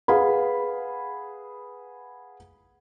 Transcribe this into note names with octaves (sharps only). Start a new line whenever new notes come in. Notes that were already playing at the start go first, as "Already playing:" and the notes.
G#4 B4 F5 F#5 B5